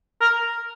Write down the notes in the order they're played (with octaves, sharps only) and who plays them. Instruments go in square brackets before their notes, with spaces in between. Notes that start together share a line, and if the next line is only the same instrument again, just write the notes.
[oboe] A#4